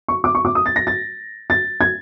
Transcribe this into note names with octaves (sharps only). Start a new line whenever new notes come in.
C#6
D6
C#6
D6
D#6
A6
A#6
A6
A6
G#6